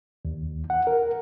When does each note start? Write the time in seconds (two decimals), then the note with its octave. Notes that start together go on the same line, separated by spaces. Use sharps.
0.25 D#2
0.70 F#5
0.87 A#4